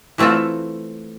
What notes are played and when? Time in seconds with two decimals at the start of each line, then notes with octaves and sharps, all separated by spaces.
0.18 E3 A3 C4 F4 A4